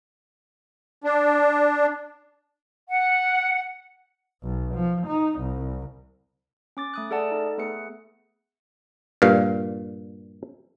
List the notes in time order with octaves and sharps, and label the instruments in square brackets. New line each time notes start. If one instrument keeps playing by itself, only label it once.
[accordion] D4
[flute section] F#5
[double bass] B1
F3
D#4
C2
[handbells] C#4 D6 A6
A3 D#6 F#6
A3 G#4 A4 D5 F#5 A5
D#4 A4
A3 B3 G#4 B4 C#7
[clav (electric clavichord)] G2 A#2 F5